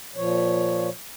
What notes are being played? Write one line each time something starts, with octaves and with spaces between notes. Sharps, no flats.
A#2 F3 C#5